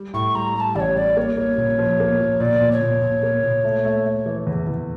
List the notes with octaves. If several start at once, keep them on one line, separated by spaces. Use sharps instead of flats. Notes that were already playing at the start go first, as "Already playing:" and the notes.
Already playing: G3
A2 C#6
G3 A#5
G3 A5 A#5
A1 C#5 D5
G3 D5
A#3 C#5
A#3
A#2
F3
A#3
F3
A#2 D5
A#2
C#5
A#2
A#2
A#3
A#2
A3
A3
A3
E3
E2
E2